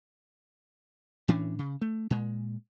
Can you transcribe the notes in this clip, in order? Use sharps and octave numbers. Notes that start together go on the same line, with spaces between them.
A2 E3 C#4 D4
C#3
A3
A#2 G#3